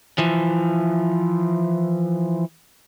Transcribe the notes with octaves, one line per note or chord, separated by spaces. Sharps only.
E3 F3